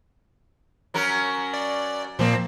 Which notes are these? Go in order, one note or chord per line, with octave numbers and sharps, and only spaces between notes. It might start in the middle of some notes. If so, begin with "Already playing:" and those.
F#3 C#4 A#4
D5
A#2 F3 A#3 C4